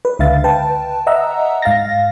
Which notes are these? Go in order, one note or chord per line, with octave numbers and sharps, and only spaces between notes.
B4
C#2 D3 E5 F5 A6
B4 G5 A5
D#5 E5 F#5 A#5 E6
G#2 F5 A6 A#6